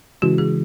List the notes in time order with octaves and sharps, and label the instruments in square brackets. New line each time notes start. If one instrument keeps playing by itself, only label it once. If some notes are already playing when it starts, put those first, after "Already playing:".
[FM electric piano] C#3 E3 G#3 [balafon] F#4
[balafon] G#4